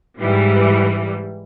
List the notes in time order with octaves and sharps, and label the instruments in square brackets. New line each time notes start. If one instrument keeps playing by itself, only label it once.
[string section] G#2 E3 G3